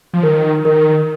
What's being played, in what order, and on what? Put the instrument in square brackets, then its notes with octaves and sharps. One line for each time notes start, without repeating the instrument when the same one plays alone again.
[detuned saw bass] F3
[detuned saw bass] D#3 [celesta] A#4
[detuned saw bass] D#3 [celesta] A#4